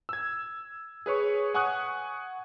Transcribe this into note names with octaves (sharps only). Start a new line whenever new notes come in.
E6 G#6
G#4 B4 C#5 C#6
F#5 G#5 C#6 D#6 F#6